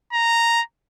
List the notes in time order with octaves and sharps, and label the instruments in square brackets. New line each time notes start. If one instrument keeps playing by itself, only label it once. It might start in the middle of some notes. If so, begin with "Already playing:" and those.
[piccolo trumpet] A#5